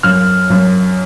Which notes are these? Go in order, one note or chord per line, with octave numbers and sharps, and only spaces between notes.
F#2 F6
F#2